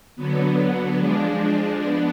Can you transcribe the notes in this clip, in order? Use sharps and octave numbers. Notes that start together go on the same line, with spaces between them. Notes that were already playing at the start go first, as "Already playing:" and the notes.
D3 F#3 B3
F3 G#3 D4
B3 D4